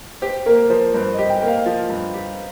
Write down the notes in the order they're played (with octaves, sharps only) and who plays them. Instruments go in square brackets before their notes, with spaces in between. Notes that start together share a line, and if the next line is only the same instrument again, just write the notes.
[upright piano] G4 [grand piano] C5
[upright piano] A#3 [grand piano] A#4
[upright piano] F3 [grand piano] C5
[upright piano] G2 [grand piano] C5
[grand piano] D#5
[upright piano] G4
[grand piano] G5
[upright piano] A#3 [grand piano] F5
[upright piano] F3
G2
G4